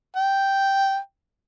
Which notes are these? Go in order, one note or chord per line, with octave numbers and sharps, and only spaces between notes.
G5